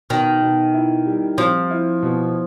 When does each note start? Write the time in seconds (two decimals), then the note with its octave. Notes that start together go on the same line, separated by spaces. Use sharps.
0.10 B2 D#3
0.42 B2
0.74 E4
1.06 G3
1.38 F3 C4
1.71 E4
2.02 B2